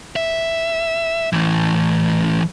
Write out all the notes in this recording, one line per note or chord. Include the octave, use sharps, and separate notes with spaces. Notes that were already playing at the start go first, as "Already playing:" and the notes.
E5
A2 E3